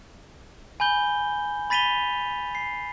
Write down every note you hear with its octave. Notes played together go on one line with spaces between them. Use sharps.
G#5 B5 G6 G7
B5 A6 B6 D#7 F7 G7
C7